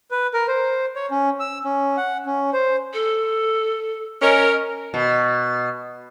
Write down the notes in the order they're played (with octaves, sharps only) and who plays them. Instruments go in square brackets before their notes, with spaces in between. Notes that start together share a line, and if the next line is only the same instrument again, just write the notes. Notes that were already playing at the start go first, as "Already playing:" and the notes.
[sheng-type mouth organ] B4
A#4
C5
C#5
C#4
E6
C#4
F#5
C#4
C5
[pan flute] A4
[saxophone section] C#4 A#4 [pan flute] D#5
[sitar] B2